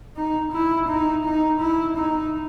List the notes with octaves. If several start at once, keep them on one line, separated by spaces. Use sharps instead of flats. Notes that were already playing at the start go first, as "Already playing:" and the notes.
D#4
E4
D#4
D#4
E4
D#4